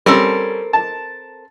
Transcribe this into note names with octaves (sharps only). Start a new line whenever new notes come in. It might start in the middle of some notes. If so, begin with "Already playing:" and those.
G3 C4 C#4 A4 A#4 E6
A5